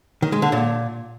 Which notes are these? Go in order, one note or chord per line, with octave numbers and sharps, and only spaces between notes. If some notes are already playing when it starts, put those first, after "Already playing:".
D#3
G#3
D3
A#2